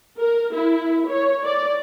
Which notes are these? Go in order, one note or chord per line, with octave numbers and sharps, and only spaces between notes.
A#4
E4
C#5
D5